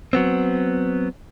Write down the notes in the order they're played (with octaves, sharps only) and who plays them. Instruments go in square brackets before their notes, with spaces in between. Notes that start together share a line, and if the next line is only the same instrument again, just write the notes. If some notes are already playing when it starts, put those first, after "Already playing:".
[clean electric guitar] F#3 B3 C4